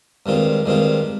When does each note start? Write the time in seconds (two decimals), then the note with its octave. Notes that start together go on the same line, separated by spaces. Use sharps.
0.26 G2 D#3 G#3 C4 F4
0.66 G2 D#3 G#3 C4 F4